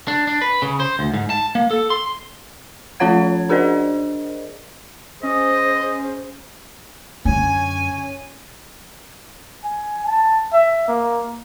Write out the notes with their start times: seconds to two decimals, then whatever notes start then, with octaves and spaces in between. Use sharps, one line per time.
0.08 D4
0.27 D4
0.42 B4
0.62 C#3
0.80 C5
0.99 D2
1.14 G#2
1.30 A5
1.55 A#3
1.71 A4
1.90 C6
3.00 F3 C#4 F4 C#5 F#5 G#6
3.49 D4 G#4 A#4 C5 D5 D#5
5.23 C#4 G#4 C5 D#5
7.25 F#2 D3 C#4 G#5
9.64 G#5
10.06 A5
10.53 E5
10.88 A#3